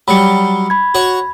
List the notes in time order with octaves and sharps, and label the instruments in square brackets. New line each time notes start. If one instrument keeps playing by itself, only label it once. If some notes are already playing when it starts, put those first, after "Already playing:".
[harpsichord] F#3 G3 [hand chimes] B5 C#7
[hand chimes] B5 G#6
[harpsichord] F#4 C#5